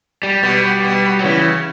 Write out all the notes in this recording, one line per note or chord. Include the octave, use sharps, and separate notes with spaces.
G3
B2 G3
B2
F#3
C#3 E3